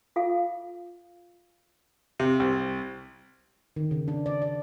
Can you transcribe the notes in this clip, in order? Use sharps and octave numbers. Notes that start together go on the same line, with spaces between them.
F4 A4 F5
C3
C2
D#3
C#3
D4
D5
D5